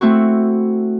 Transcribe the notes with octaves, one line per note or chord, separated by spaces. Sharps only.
A3 C4 E4 F#4